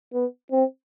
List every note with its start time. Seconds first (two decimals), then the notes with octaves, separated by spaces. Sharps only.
0.14 B3
0.52 C4